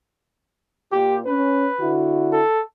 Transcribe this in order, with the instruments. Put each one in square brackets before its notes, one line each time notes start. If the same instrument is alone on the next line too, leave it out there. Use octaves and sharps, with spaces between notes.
[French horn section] A#2 F4 [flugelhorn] G4
[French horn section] C#4 [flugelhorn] B4
[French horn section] D3 E4 F#4
[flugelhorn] A4